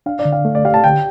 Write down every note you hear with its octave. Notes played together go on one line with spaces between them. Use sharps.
D4 F5
D5
D3
F5
A3
D5
G4 F5
A5
D3 G5